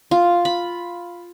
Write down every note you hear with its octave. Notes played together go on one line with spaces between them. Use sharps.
F4
B5